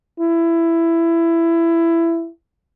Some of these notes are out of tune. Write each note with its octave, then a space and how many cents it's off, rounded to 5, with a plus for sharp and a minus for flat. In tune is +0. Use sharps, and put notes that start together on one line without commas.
E4 +15